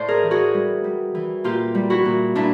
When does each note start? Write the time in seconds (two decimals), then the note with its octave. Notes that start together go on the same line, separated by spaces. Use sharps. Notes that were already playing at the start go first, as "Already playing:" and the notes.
Already playing: A2 C5 D5
0.08 G#4 A#4
0.23 E3
0.31 F#4 G#4
0.54 G3
0.84 G3
1.15 E3
1.44 A#2 F4 G4
1.75 G3
1.90 E4 F#4
2.05 A#2
2.35 A#2 D4 E4